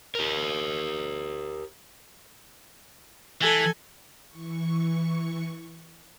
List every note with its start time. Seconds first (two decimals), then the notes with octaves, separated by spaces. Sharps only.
0.15 G4 A#4
3.42 E3 A4 G#5
4.28 E3 C#6